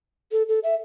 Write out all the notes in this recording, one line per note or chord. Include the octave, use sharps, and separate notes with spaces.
A4
A4
E5